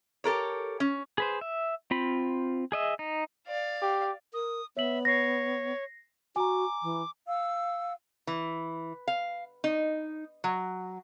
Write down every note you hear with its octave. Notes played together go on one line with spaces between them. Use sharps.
G4 A4 A#4 C#5
C#4
G#4 B4 C5
E5
C4 F4 B5
G#4 D#5 E5
D#4
D5 F5
G4
A#4 D#6
B3 C#5 E5 F#7
C#5 A#6 C7
F#4 G#5 A#5 D6
E3
F5 F#5 E6
E3
F5
D#4
F#3